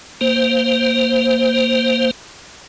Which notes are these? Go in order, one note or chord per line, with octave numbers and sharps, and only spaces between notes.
A#3 C5